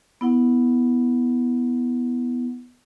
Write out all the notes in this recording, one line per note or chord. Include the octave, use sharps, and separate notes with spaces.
B3 E4 F#5